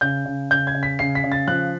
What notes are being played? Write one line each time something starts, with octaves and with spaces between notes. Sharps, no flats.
C#3 G6
C#3
C#3 G6
G#6
C#3
B6
C#3 C7
B6
C#3
A6
F3 F#6